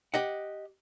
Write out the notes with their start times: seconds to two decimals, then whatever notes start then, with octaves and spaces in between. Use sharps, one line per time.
0.14 G4 D#5 F#5